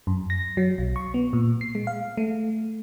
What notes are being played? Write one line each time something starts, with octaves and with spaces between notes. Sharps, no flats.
F#2
A#6
F#3
B1
C#6
B3
A#2
C7
G#3
F5
A3